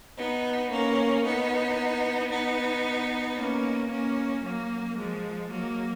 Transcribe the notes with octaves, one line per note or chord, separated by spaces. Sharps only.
B3 D#4
A#3 C#4
B3 D#4
B3 D#4
A#3 C#4
A#3 C#4
F#3 A#3
F3 G#3
F#3 A#3